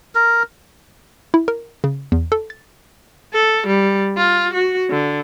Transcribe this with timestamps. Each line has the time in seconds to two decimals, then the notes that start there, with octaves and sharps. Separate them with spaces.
0.15 A#4
1.34 E4
1.48 A#4
1.84 C#3
2.12 E2
2.32 A4
2.50 A6
3.34 A4
3.67 G3
4.18 F4
4.53 F#4
4.90 D3